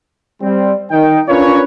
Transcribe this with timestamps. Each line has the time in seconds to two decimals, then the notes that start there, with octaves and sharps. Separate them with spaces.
0.42 G3 C4
0.91 D#3 D#4 G5
1.29 C#4 D4 F4 A#4 B4 C#5